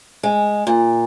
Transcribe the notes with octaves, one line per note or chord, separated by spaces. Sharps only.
G#3
A#2